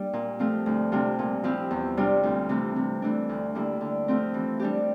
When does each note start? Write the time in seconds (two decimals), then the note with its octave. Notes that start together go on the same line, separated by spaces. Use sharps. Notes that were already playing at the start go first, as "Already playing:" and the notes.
Already playing: G3 A#3 D4
0.13 A#2
0.39 F3 A3 C4 F4
0.66 D2
0.92 C3 G3 D4 F4
1.19 A#2
1.44 F3 C4 E4 G4
1.71 E2
1.97 C3 G3 D4 F4
2.23 D2
2.49 C3 E3 A3
2.76 C3
3.02 E3 A3 D4
3.29 D2
3.55 D3 G3 A#3 E4
3.81 D3
4.08 F3 A3 C4
4.34 E3
4.60 G3 D4 G4